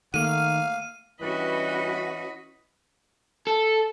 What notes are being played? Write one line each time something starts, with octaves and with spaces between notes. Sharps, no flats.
D#3 A3 A#3 F5 D#7
E3 G3 C#4 D4 F#4 B4 D#5 B5
A4